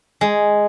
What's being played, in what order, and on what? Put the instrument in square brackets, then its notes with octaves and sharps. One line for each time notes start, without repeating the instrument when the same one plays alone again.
[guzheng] G#3